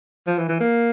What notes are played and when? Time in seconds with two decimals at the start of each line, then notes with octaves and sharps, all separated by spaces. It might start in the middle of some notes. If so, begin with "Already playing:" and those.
0.27 F3
0.38 E3
0.49 E3
0.60 A#3